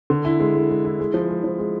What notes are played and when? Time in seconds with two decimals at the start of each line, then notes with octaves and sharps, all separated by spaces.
0.10 D3
0.25 E4
0.40 G#3
0.55 G#3
0.70 G#3
0.85 E4
1.00 G#3
1.14 F3
1.29 G#3
1.44 F3
1.59 G#3